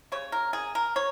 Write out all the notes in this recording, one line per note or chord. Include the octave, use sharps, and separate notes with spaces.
C#3 G3 C#5
A#4
G#4
A#4
C#5